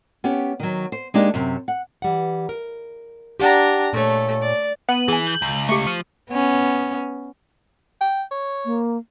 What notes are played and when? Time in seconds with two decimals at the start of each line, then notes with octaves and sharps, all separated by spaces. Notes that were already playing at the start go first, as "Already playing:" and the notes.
0.24 B3 C#4 G4
0.60 D#3 F#3
0.92 C5
1.14 G#3 A#3 D4 D#4 G4
1.34 F#2 C3
1.68 F#5
2.02 E3 G3 F#5
2.49 A#4
3.39 D4 G4 F#5 G5 A#5
3.93 A#2 A3 C#5
4.42 D5
4.89 B3 F#5 D#7 F#7
5.08 E3 G#4 G#5
5.27 G6
5.42 C#2
5.69 A3 G4 C#6 C#7
5.87 F3 D#7
6.30 B3 C#4
8.01 G5
8.31 C#5
8.65 A#3